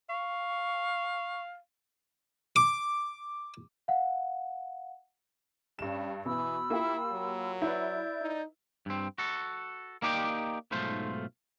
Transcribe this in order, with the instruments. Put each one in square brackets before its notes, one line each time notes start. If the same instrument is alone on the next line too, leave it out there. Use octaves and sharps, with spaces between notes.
[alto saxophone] F5 [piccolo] C#6
[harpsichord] D6
[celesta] F5 F#5
[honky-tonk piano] G2 E7 [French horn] G3 [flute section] C#4
[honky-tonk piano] B2 [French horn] E3 [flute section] B5 E6
[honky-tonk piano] A#3 F4 G4 [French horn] E4
[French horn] F#3
[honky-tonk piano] E4 B4 [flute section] D5 G6
[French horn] D#4
[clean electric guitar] G2 C4
F#4 A4
A#3 D#4 G4 D5 F#5 G5
B1 G#2 A3 F4 C5